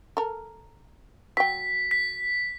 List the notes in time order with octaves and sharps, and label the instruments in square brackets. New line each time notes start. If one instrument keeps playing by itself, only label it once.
[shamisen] A4 A#4
[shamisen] F#3 G5 [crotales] B6
[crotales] B6